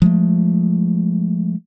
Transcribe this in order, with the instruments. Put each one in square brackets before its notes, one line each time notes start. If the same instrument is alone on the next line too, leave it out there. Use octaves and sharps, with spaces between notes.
[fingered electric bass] F3 G#3 A3